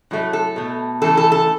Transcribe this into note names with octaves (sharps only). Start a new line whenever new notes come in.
A2 F#3 A3
A4
B2 A3
C#3 E3 A3 A4
A4
A4